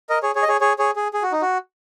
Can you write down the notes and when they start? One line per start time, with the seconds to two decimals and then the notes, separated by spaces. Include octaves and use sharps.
0.09 A#4 D#5
0.23 G#4 C#5
0.35 G#4 C#5
0.42 D#5
0.48 G#4 C#5
0.61 G#4 C#5
0.79 G#4 C#5
0.96 G#4
1.14 G#4
1.23 F#4
1.32 D#4
1.42 F#4